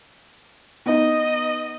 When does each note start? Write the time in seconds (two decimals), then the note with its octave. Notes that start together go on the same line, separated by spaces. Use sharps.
0.86 B3 D#4 D#5